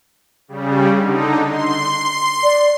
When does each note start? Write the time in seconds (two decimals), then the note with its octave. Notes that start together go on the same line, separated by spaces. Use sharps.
0.48 C#3 G3
0.97 D3 D#4
1.49 C6
2.44 D5